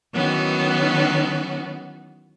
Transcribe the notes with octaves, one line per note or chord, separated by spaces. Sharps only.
D#3 E3 F#3 B3 C#4 F#4